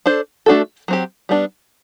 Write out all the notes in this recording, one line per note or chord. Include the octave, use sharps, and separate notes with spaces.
D4 A4 C5
A3 D4 F#4 A4
F#3 C4 G4
G3 B3 D4